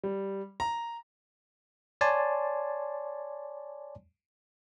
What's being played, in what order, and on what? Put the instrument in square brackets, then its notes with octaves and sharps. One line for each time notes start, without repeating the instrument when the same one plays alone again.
[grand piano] G3
A#5
[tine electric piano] C#5 D5 G#5 A5 C6